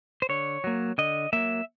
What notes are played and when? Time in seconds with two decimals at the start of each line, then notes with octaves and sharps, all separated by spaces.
0.22 C5
0.29 D3 C#5
0.64 F#3 A#3
0.98 D3 D#5
1.33 F#3 A#3 E5